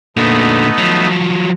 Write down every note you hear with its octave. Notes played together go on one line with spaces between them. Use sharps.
A#2 D3 A3 B3 D#4
F3 F#3